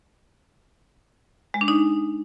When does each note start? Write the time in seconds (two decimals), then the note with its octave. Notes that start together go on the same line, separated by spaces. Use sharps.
1.54 G#3
1.61 D4
1.68 D#4